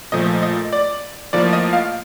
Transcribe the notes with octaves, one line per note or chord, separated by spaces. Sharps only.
A#2 F3 A3 D#5
D#5
D5
A2 F3 A#3 D5
D#5
F5